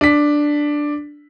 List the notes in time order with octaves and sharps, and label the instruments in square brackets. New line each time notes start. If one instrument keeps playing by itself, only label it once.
[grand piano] D4 B6